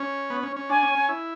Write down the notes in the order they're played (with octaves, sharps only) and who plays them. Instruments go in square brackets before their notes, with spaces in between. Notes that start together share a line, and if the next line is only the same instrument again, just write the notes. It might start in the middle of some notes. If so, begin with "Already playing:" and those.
Already playing: [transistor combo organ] C#4
B3
C#4
C#4
[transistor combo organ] D4 [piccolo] G#5
[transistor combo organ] C#4
C#4
E4